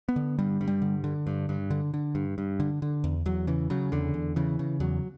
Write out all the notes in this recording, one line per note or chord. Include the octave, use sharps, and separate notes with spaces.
B3
D3
G2 G3
G2
G3
D3
D3
G2
G2
D3
D3
G2
G2
D3
D3
E2
E2 F#3
C#3 E3
C#3 F#3
E2 D3
E2
C#3 E3
C#3
E2 F#3